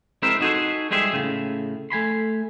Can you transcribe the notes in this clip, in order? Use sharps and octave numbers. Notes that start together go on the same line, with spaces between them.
G#3 C4 E4 A#4 C5 E5
D#4 F#4 G#4 A4 B4 C5
G3 G#3 G4 G#4 C5 E5
A2 C#3
A3 G#5 B5 C6